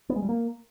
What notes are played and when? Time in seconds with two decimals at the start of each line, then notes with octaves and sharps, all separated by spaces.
0.09 B3
0.16 G#3
0.22 G3
0.29 A#3